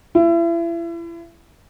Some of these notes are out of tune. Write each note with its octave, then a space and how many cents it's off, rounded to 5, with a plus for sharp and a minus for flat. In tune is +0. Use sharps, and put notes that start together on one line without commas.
E4 +35